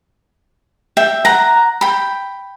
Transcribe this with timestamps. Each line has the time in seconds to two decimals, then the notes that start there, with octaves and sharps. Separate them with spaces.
0.97 E5 G5
1.25 F#5 A#5
1.81 G5 B5